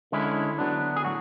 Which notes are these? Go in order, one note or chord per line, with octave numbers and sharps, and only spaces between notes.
D3 G#3 C#4 E4
D3 F#3 B3 D4
G#4
A2 F#3 F#4